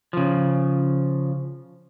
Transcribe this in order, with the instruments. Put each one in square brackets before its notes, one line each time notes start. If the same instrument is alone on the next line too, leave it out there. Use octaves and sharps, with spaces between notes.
[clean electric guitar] C#3 F3